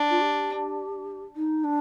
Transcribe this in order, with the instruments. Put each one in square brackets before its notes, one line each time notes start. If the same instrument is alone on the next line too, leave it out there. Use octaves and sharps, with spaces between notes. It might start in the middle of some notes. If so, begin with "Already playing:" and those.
Already playing: [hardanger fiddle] D4
[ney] F4
G4
D#4
D4